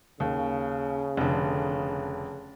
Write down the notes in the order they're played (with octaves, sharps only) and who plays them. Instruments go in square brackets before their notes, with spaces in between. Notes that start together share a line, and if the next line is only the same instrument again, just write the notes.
[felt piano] D#2 [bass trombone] C#3
[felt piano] F1 D3